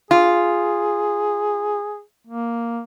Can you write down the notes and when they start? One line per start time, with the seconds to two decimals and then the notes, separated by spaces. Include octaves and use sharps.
0.11 F4 G#4
2.27 A#3